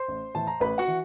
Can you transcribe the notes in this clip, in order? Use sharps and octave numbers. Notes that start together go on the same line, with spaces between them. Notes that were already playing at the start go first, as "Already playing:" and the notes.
Already playing: C5 C6
A1
A2 E3 A5
A#5
A1 B4 B5
F#4 F#5
E3